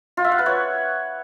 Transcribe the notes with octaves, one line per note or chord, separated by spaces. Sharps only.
F4
E5
F#5
B4
C#5